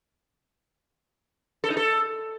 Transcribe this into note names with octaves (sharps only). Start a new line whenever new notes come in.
A4
D#4
A4